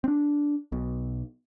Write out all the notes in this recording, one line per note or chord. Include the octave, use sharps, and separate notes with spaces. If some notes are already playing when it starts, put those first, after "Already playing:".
C4 D4
B1 B2